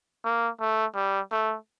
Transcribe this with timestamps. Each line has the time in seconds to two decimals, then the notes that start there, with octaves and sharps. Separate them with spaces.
0.25 A#3
0.60 A3
0.95 G3
1.31 A3